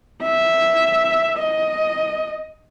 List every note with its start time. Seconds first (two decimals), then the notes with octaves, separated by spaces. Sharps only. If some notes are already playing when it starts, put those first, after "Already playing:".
0.23 E5
1.38 D#5